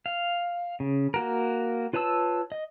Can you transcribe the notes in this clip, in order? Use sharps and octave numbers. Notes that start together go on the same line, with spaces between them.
F5
C#3
A#3 F#4 A#4
F4 B4 C#5 A5 E6
D#5